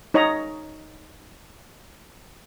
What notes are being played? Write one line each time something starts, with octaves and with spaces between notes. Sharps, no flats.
D#4 C#5 D#5 A#5